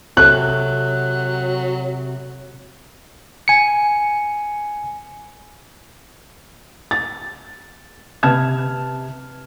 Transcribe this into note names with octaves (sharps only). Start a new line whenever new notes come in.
C3 F#3 C4 A4 F#6
G#5 C#7
A6
C3 B4 A5 F6 G#6 E7